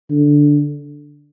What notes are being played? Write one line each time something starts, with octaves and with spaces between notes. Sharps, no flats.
D3